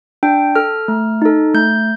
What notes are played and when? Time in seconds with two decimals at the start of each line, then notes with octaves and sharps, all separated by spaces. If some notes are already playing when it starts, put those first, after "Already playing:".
0.23 D4 G5
0.55 A4 F6
0.88 A3
1.22 D#4 A4
1.54 A3 G6